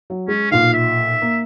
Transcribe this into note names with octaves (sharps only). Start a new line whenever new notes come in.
F#3
G#3 C#4
B1 A#2 F5
E5
A#3